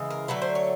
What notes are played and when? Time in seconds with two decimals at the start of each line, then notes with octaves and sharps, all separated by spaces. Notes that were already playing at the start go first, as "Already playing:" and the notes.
Already playing: C#3 E3 G#3
0.10 A#4
0.28 D3 F#3 A3 B4
0.42 C5
0.55 C#5